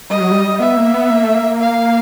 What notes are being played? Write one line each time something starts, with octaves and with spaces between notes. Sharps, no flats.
G3 D#5
F#3
G3
B3 E5
A#3
B3
A#3
A3
A#3
F5